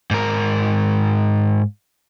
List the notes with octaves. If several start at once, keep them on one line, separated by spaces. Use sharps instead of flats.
G#2 A#4